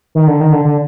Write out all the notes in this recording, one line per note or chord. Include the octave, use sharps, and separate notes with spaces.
D#3
D3
D#3
D3
D3